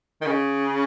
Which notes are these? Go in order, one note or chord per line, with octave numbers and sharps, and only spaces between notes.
D#3
C#3